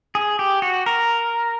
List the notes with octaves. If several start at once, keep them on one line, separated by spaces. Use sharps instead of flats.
G#4
G4
F#4
A#4